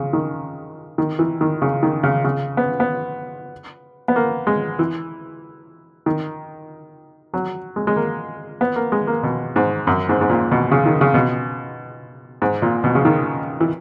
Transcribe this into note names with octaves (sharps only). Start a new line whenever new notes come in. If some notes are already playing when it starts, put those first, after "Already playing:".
Already playing: C#3
D#3
D#3
E3
D#3
C#3
D#3
C#3
C#3
B3
B3
B3
A#3
G#3
E3
D#3
F#3
G#3
G#3
A#3
B3
A#3
G#3
A#3
B2
G#2
F#2
G#2
G#2
A#2
B2
C#3
D#3
C#3
B2
G#2
A#2
B2
C#3
D#3
E3